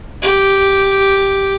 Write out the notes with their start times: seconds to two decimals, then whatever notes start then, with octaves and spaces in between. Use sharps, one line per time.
0.22 G4